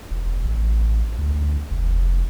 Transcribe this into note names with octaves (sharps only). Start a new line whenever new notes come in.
E1
A1
D2
F1